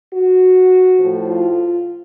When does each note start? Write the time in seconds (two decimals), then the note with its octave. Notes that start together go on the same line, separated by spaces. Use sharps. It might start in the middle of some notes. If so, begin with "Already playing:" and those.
0.13 F#4
0.99 A2 F3
1.28 F4